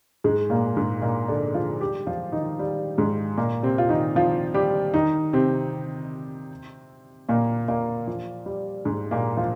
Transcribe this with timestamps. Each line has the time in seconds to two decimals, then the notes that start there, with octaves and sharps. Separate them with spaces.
0.24 G#2 G#3
0.50 A#2 A#3
0.76 G#2 G#3
1.02 A#2 A#3
1.28 D3 D4
1.54 F3 F4
1.81 G3 G4
2.07 F3 F4
2.32 D#3 D#4
2.59 G3
2.98 G#2 G#3
3.38 A#2 A#3
3.63 C3 C4
3.78 F4
3.89 D#3 D#4
4.16 F3 F4
4.54 G3 G4
4.94 D#3 D#4
5.33 C3 C4
7.29 A#2 A#3
7.68 A#2 A#3
8.07 F3
8.46 G3
8.85 G#2 G#3
9.11 A#2 A#3
9.37 F3 F4